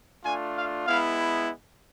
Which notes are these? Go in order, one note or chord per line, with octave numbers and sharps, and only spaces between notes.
A3 D4 F4 G#5
F5
G#3 B3 E4 F5